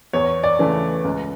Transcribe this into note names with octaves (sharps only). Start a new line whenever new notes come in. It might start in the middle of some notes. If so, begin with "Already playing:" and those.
E2 C#5
D5
C#3 E3 A3 C#4
C#2